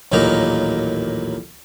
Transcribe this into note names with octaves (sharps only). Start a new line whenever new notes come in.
A1 D#2 A#2 F#3 D#4 A#4